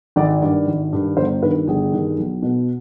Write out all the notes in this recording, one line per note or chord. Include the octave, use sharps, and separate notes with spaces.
G#1 D5
G2 D#3 D5
G#1
G2 D#3
G1 C5
G2 D#3 B4
G1 G#4
G2 D#3
B1
B2